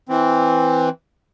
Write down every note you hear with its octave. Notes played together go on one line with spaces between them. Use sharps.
E3 C4